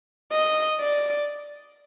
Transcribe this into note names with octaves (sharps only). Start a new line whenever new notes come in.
D#5
D5